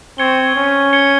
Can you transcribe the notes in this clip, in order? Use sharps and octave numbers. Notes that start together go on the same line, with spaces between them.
C4 C#6 G#6 C#7 G7
C#4
G#6 C#7 G7